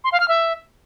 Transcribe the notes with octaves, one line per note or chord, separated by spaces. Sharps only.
C6
F5
F6
E5